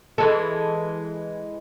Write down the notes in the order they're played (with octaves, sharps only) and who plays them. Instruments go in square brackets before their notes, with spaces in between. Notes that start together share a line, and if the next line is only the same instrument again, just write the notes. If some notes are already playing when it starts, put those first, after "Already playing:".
[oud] E3 G#3 A4